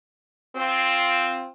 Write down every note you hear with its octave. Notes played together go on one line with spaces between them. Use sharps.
C4 F4